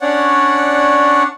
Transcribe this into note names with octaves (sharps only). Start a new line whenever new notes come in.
C#4 D4 C#5 D5 F#5